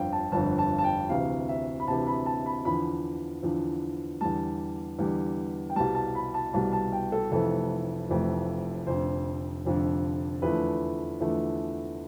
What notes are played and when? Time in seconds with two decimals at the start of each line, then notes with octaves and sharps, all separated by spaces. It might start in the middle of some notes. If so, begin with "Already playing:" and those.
Already playing: G1 F2 D3 F5 G5
0.13 A5
0.32 G1 F2 D3 A5
0.58 A5
0.78 A5
0.84 G5
1.09 D2 C3 E3 F5
1.49 E5
1.80 B5
1.88 D2 C3 E3 A5
2.07 B5
2.26 A5
2.46 B5
2.65 E2 D3 F3 B5
3.43 E2 D3 F3
4.21 E2 D3 G3 A5
4.99 E2 D3 G3
5.70 G5
5.76 C2 B2 G3 A5
5.95 A5
6.15 B5
6.34 A5
6.54 C2 B2 G3 A5
6.73 A5
6.92 G5
7.12 A4
7.31 F1 F2 E3 A3 A4
8.09 F1 F2 E3 A3
8.87 F1 F2 D3 C5
9.65 F1 F2 D3
10.42 E2 D3 F3 A3 B4
11.20 E2 D3 F3 A3